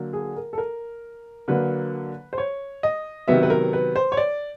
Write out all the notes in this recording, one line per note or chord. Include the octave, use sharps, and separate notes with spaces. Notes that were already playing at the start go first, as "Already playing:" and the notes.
Already playing: D3 F#3 A#3
G#4
A#4
A4
A#4
D3 F#3 A#3 B4
C5
C#5
D#5
C3 D#3 F#3 B3 E5
B4
A#4
B4
C5
C#5
D5